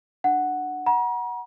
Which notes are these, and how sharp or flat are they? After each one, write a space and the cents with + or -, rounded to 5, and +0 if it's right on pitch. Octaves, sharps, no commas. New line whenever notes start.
D4 +20 F#5 +0
F#5 +0 A#5 +40